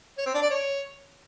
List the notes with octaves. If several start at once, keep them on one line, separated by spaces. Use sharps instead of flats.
C#5
C4
D4
D5
C#5